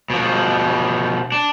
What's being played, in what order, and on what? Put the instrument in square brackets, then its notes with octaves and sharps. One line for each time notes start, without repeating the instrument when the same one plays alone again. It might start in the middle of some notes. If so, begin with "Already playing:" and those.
[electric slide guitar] B2 F3
D4